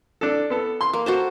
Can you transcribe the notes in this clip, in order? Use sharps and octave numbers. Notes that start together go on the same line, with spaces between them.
D4 A4
B3 A4
C6
A#3
F#4 A4 C5